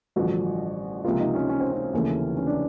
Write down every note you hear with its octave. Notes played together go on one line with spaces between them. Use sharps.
A1 G2 D3 F3 F#4
C#2 C3 F3 A#3 F4
D#4
C#4
C#4
C4
C#4
F1 D#2 C#3 E3 A3
C#4
D4